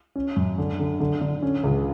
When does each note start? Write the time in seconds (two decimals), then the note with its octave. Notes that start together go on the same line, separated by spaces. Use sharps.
0.16 C#4
0.36 F#2
0.58 D3
0.79 D3
1.00 D3
1.21 D3
1.42 C#4
1.64 C#2